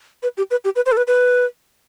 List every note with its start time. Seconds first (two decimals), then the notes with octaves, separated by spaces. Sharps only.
0.23 B4
0.37 G4
0.51 B4
0.65 G4
0.76 B4
0.86 C5
0.92 A4
0.97 B4
1.07 B4